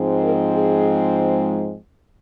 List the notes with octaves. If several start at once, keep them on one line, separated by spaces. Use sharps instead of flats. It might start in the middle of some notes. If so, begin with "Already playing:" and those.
Already playing: G#2 F3 G#3 C4
A#4
G#4